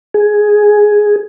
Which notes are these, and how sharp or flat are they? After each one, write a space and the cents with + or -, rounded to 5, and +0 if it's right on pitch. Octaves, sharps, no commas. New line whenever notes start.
G#4 +5